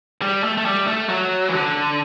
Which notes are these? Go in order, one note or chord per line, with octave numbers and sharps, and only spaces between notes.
G3
A3
A3
G3
A3
F#3
E3
D3